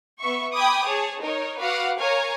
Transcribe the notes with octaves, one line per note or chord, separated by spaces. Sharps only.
B3 E5 C#6
G5 G#5 B5 D6 D#6
G#4 C#5 A5
D#4 A#4 C#5
F#4 B4 F5 F#5 D6
A#4 C#5 F5 G#5 A#5